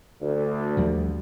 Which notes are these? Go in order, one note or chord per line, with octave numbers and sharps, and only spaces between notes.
D2
D#2 F3 G3